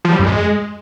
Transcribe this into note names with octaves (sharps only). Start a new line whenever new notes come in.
F3
G3
F#2
G#3